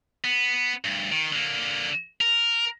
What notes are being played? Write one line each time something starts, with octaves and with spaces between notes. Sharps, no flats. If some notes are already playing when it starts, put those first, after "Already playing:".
B3
D2 G2
D#3
D3 A#3
A#4